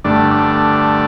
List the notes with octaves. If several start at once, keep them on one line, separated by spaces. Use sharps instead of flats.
G2 D3 A3 D4
D4